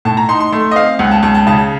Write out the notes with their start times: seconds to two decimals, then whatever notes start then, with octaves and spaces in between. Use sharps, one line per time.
0.05 A2 A5
0.17 A#5
0.29 D#4 C6
0.40 C6
0.52 A3 C6
0.71 D#5
0.75 C4 F5
0.99 C#2 F#5
1.11 A5
1.23 C#2 A5
1.34 A5
1.47 C#3 A5